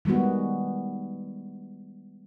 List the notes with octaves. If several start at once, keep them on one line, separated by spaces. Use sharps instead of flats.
D#3 G3 G#3 B3 F#4